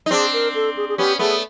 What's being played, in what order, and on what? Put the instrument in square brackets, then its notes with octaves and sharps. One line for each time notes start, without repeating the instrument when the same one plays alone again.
[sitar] D#4
[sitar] C4 D4 [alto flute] G#4
[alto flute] A#4
A4
G#4
G#4
[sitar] B3 C#4 [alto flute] G4
[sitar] A3 B3 [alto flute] G#4